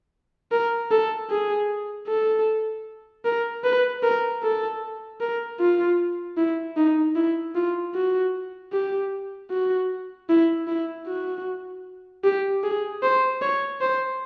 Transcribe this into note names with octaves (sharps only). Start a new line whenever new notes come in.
A#4
A4
G#4
A4
A#4
B4
A#4
A4
A#4
F4
E4
D#4
E4
F4
F#4
G4
F#4
E4
E4
F#4
G4
G#4
C5
C#5
C5